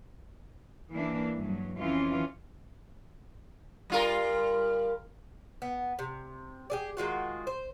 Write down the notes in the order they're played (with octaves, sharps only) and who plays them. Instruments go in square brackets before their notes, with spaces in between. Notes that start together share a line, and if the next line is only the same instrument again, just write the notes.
[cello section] E3 A#3 D4
G2 F#3
F2 E3 C#4 F4
[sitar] G3 F4 A#4
[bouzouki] B3
C3
G4 G#4 D5
D#3 G#3 F4 F#4
C5